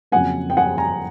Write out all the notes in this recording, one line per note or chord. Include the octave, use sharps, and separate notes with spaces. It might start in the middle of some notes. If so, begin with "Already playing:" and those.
F2 C#3 F#3 A#3 F#5 G#5
G5
F#5 G#5
G#5 A#5